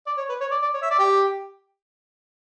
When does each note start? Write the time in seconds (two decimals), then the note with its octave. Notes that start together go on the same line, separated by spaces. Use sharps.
0.06 D5
0.17 C#5
0.29 B4
0.40 C#5
0.51 D5
0.62 D5
0.74 C#5
0.82 E5
0.90 D5
0.99 G4